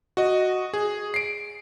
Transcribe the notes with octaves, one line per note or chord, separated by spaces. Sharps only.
F#4 D#5
G#4
C7 D7